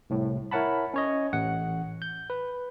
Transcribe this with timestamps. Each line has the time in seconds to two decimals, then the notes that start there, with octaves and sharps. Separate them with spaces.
0.10 C2 A2
0.51 E4 A#4 C#5 F#5 A5 B5
0.94 C#4 C#5 D#5
1.33 A1 F#5
2.02 G6
2.30 B4